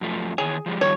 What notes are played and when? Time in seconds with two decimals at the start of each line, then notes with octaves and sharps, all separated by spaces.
0.01 F#2 F3 A3
0.38 D#3 E3 G#4 C#5
0.66 F3 G3 G#3
0.81 D#3 F3 G3 C#5